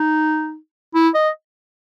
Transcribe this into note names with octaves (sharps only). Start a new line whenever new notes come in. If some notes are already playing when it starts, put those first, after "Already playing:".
Already playing: D#4
E4
D#5